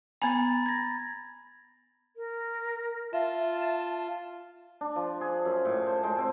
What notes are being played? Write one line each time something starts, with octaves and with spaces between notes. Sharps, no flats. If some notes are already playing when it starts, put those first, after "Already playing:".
B3 G#5 A#5 B5 A6
G#6 A#6
A#4
F4 E5 A5
D4
F3
G#4
F#2
A2
C5
G#3
C4